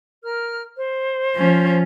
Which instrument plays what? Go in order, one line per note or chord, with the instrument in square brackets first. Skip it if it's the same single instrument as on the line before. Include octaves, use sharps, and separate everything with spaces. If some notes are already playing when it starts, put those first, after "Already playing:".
[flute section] A#4 F6
C5
[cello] F3 C#4